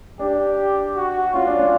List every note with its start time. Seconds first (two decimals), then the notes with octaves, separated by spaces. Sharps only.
0.19 D4 G4
0.96 F#4
1.34 C#4 F4
1.47 D4
1.59 C#4